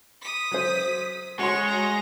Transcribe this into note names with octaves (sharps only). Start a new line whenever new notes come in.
D#6 B6
F#3 C5
G#3 F#4 C#5 F#5 C6 C#6
A#5